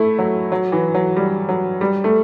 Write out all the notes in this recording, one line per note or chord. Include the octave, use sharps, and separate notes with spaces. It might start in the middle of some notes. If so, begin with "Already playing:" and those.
Already playing: A3 E4
F#3
F#3
E3
F#3
G3
F#3
G3
A3